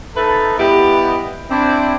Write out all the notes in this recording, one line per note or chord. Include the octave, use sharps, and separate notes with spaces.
D#4 A4 B4 E5 A5
G3 B3 E4 G4 D#5 F#5
C4 D4 E4